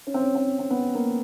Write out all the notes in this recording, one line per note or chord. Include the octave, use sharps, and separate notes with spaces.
C#4
C4
C#4
C4
C4
B3
A#3